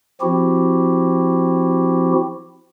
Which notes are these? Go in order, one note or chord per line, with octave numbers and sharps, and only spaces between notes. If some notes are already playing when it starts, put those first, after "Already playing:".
F3 C4 E4 F#4 G4